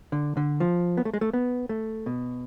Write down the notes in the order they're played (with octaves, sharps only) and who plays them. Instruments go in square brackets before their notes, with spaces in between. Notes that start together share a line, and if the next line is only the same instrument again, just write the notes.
[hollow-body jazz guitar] D3
D3
F3
B3
A3
G#3
A3
B3
A3
B2